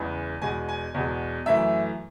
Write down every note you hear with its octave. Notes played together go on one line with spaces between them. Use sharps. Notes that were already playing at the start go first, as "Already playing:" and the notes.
Already playing: E2 C#3 E3 G#3
E2 B2 G#3 G#5
G#5
E2 B2 G#3
F#2 E3 A3 E5